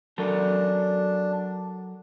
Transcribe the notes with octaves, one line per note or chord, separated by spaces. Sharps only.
F#3 D4 A4 A#4